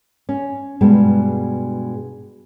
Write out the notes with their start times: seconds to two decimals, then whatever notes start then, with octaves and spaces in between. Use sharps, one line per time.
0.29 C#4
0.81 G2 B2 G#3 G5